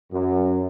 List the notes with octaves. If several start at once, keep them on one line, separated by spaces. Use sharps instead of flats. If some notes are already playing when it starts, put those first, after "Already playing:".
F#2